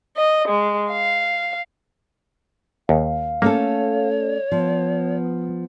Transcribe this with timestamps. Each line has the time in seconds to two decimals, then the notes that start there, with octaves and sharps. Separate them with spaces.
0.16 D#5
0.48 G#3
0.90 F5
2.89 D#2 F5
3.42 A3 A#3 C#4 A4 C#5
4.19 D5
4.52 F3 B3